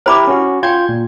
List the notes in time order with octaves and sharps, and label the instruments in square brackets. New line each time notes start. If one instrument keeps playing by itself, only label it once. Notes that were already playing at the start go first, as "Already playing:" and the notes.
[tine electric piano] E4 G4 A#4 [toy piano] C5 B5 D6
[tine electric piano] C#4 F#4
[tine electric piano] F4 G6 G#6 [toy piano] G5 G#5
[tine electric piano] A#2